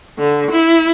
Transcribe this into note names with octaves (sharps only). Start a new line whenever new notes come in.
D3
E4